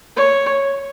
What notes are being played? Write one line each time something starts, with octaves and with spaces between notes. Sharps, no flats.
C#5